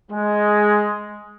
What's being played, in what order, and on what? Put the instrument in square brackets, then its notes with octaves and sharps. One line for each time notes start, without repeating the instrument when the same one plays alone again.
[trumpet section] G#3